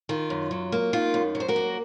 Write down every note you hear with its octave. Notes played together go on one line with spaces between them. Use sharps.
D#3 F4
F#2
F#3
A#3
D#3 F4
F#2
F#3
C5
F#4 A#4
A#3